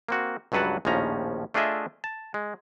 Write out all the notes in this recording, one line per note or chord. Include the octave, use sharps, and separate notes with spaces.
A#3 C4 F#4
C#2 G2 F#3 B4 F#5 A5
A#1 D#2 A2 F3 C#4 A#5
A3 D4 F4 G#4 D#5 E5
A5
G#3